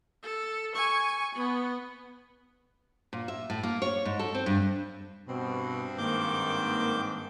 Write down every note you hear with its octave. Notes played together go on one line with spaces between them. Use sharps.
A4
G#5 C#6
B3
A#2
E5
A2
A#3
C#5
G#2
A4
C4
G2
G2 B2 C4
G#2 D#3 A#3 D6 G6